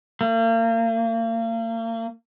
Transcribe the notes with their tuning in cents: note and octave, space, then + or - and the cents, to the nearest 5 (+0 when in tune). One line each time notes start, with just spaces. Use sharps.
A#3 -40